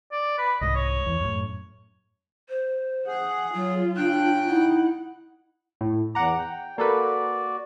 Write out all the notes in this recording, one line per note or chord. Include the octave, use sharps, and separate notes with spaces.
D5
B4
C2 G#2 D#5
C#5
E2
F#2 A2
C5
G#4 F#5
F#3 F4
C#3 D4 G5 F#6
D#4 E4 F#5
A2
E2 F#5 A#5 D6
G5
A#3 F#4 A4 B4 D5